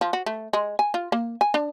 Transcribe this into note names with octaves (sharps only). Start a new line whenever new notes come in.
F3
F#4
A3
G#3
G#5
F4
A#3
G#5
D4